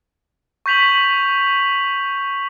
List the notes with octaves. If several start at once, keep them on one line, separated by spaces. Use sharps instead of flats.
C#6 G6 B6 F7 F#7